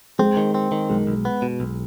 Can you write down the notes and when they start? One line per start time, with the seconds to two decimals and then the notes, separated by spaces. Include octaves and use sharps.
0.19 G#3 C4
0.37 D#3
0.55 C4
0.72 D#3
0.89 B1 G#3
1.07 B1
1.25 B3
1.42 B2
1.60 B1